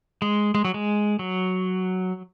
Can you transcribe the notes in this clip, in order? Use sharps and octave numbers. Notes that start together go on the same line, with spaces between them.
G#3
G#3
F#3
G#3
F#3